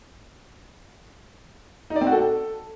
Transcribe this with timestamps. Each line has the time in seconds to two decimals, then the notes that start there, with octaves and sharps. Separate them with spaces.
1.90 D#4
1.96 D5
2.01 C4
2.07 F#4
2.12 A4